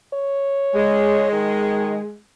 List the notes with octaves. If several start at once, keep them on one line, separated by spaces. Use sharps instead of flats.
C#5
G#3
D#3